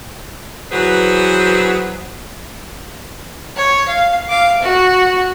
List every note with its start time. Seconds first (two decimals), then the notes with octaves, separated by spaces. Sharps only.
0.72 E3 F#3 F#4 G#4 B4 C5
3.57 C#5
3.88 F5
4.29 F5 D6
4.62 F#4